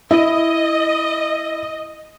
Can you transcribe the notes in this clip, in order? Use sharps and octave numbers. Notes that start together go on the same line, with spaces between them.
E4 D#5